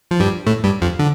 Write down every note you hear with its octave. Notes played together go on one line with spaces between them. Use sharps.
F3
G2 G3
A2 A3
G2 G3
F2 F3
D3